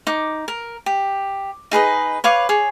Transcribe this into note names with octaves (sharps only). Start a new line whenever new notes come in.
D#4 D6
A#4
G4
D#4 G#4 B4 D#5
B4 C#5 F5 D6
G#4 C#5